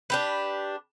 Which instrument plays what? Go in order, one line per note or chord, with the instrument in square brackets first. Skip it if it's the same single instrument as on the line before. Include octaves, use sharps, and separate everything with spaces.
[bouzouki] D4 G4 B4